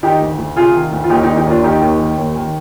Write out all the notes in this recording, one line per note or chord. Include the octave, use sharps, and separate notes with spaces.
D#3 D#4 G4
D2
D2
C3 F4 G#4
D#3
D2
F4
D#2 D#4 G4
D#4 G4
D#3
D#4 G4
D#2 D4 F4
D#3 D#4 G4
D#2
D#3
D#2
D#3